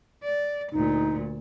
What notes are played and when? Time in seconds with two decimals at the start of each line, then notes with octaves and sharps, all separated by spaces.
0.23 D5
0.73 D2 A#2 D#4